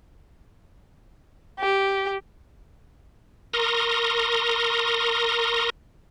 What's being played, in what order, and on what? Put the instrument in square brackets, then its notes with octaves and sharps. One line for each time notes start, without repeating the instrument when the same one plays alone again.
[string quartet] G4
[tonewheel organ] A#4 A#5 C6 C#6 D#6